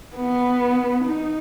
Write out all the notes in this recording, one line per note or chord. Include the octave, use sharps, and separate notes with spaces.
B3
D#4